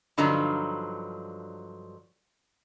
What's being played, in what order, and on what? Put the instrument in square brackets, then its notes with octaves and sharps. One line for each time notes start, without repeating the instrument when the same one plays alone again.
[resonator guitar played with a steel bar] G2 D3 F3 F#3 D#4 A#5